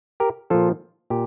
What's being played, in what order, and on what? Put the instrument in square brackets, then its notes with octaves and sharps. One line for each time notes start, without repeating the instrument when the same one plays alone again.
[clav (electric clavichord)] G4 A#4
A#2 F3 F4 A4
A#2 G4